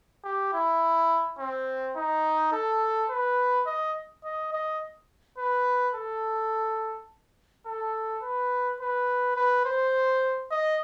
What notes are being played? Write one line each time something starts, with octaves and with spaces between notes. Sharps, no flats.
G4
E4
C4
D#4
A4
B4
D#5
D#5
D#5
B4
A4
A4
B4
B4
B4
C5
D#5